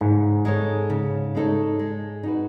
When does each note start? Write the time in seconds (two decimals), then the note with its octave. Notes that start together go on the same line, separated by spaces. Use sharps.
0.01 G#2 C#3
0.45 G#3 D#4 A4 C#5
0.90 C#3
1.35 G#3 D#4 A4 C#5
1.79 G#3
2.23 D#4 F#4 B4